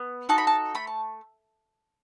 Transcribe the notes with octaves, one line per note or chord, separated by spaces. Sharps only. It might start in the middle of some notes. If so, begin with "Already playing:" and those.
Already playing: B3
D#4 F#4 A4 A5
B5
A5
A3 B5
A5